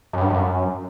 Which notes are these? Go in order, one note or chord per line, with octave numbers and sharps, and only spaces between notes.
F#2
G2
F#2